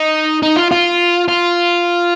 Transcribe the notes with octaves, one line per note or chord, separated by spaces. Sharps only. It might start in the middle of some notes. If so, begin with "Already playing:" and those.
Already playing: D#4
D#4
F4
F4
F4